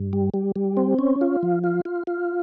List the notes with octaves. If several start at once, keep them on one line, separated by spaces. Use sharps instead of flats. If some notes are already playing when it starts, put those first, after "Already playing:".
Already playing: G2
G3
G3
G3
C4
C#4
F4
F3
F4
F4
F4